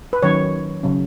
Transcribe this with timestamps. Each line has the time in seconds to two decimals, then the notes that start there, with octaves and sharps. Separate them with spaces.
0.13 B4
0.23 D#3 F#3 C#4 C#5
0.83 C#3 F#3 C#4